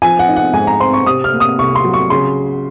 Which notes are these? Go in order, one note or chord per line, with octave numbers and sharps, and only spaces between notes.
F3 G#5
F#5
D#4
F#5
G#2 G#5
A#5
C4 C6
C#6
C3 D#6
F6
A#3
D#6
C2 C#6
C6
F#3
C#6
C#3 C6